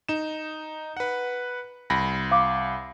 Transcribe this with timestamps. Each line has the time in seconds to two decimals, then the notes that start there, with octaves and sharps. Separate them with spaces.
0.09 D#4 E7
0.97 B4 F#5
1.90 C2 B5 A#6
2.31 F5 D6